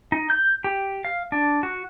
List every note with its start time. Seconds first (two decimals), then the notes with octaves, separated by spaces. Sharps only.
0.12 D#4
0.30 G6
0.64 G4
1.05 F5
1.32 D4
1.63 F#4